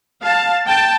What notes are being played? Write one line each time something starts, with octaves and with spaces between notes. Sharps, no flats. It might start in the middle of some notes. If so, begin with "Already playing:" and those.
F5 A5
G5 A5